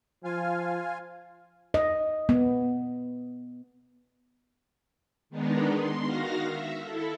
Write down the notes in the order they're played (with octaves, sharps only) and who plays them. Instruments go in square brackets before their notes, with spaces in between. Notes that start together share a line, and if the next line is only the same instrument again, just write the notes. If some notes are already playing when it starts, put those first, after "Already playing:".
[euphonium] F3 [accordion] F4 F5 G#5
[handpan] D#5
B3
[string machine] D#3 G#3 B3 D4 D#4
C6
D#3 F#4 F5 A#6
E5
E4 A4